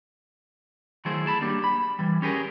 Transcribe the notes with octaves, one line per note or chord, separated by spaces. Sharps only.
D#3 F#3 A3 E4 G#4 C5
G#4 A5 B5
G3 A#3 D4 G4
B5
E3 G3
C#4 G4 G#4 A#4